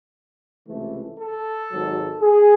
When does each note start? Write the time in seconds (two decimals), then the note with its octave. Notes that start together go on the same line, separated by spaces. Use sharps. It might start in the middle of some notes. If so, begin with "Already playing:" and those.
0.68 C#2 C3 E3 A3
1.20 A4
1.71 G#1 G#2 F#3
2.21 G#4